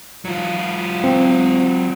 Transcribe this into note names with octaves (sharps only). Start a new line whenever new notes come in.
F#3 F4
C4